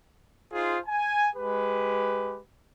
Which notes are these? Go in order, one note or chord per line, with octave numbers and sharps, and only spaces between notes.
D#4 F4 G#4 C5
G#5
G#3 G4 B4